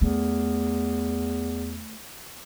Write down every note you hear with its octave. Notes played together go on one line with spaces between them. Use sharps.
E2 A3